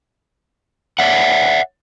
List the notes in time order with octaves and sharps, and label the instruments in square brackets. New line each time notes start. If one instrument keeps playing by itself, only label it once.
[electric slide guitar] C#5 D5 E5 F#5